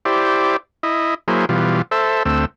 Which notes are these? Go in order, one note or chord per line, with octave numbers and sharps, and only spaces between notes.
E4 G4 C5 D5
E4 D#5
F#3 A#3 E4 G#4 C5
B2 E3 G3 F4
A4 C5 E5
D2 A3 C4 E6